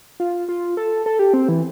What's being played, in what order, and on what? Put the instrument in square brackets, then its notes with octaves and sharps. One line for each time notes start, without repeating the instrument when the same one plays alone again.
[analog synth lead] F4
F4
A4
A4
G4
C4
E3